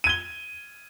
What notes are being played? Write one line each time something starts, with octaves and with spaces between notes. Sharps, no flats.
G#6 D#7 G7